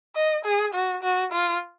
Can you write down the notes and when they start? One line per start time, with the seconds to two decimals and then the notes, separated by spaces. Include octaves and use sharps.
0.16 D#5
0.45 G#4
0.74 F#4
1.03 F#4
1.32 F4